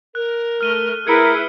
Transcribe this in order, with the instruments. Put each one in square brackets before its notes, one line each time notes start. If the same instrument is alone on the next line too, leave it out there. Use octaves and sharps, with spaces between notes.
[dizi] A#4 [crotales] F#6
[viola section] A3 [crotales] F6 D#7 G7
[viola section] E4 G#4 B4 [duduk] A#4 [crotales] G#6 C#7 D7